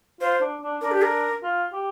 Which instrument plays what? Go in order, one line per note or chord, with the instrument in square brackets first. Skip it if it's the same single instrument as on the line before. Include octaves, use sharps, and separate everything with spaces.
[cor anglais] F4 [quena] C5
[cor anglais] D4
D4
[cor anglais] D4 [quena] A#4
[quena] G4
A#4
[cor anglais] F4
G4